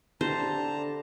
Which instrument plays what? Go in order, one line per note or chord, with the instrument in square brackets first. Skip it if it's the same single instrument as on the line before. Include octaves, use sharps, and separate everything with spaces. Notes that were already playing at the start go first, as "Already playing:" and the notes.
[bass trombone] D3 [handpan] E4 G4 [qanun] C5 [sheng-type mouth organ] A5 A#5